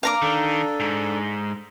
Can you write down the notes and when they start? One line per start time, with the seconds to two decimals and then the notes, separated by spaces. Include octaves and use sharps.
0.03 A#3 D4 F5 A#5 D6
0.22 D#3 D4 A4
0.80 G#2